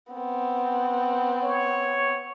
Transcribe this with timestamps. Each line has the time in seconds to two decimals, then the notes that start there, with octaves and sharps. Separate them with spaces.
0.13 B3 C4
1.44 C#5